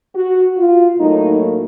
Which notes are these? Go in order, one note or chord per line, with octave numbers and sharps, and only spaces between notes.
F#4
F4
A2 F#3 A#3 D#4